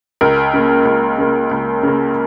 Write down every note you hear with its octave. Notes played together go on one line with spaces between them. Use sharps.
C#2 A#4
C#3 A#3
C#2
C#3 A#3
C#2
C#3 A#3